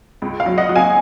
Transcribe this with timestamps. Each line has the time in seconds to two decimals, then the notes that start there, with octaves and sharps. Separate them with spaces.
0.22 C#2
0.40 F5
0.46 F#3
0.58 D#5 F#5
0.69 F#3
0.76 F5 G#5